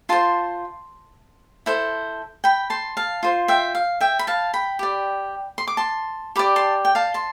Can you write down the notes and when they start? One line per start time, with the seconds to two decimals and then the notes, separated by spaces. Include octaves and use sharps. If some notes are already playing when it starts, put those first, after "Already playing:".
0.09 F4 C5 A5 C6
1.66 E4 A4 C5
2.44 G5 B5
2.70 A5 C6
2.97 F5 A5
3.23 F4 C5
3.48 E5 G5
3.75 F5
4.00 E5 G5
4.19 B5
4.27 F5 A5
4.53 G5 B5
4.79 G4 D5
5.58 C6
5.67 D6
5.77 A5 C6
6.36 G4 D5 B5 D6
6.56 A5 C6
6.85 G5
6.95 F5 A5
7.14 A5 C6